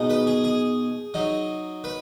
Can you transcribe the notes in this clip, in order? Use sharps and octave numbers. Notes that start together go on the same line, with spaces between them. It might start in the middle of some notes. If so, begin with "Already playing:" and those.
Already playing: B2 G#3 D#4
B4
G#4
G#4
F#3 D#4
B4